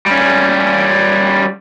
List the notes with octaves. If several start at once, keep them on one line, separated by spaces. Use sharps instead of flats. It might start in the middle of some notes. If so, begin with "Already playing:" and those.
G3 C#4